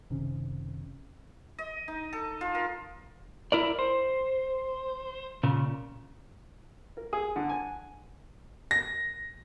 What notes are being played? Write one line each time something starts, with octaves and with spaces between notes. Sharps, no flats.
F#1 C3 D#3 C#4
D#5
D#4
A4
F4
A#4
E4 A#4 D5
C5
A#2 C#3
A#4
G#4
D3
G#5
A#6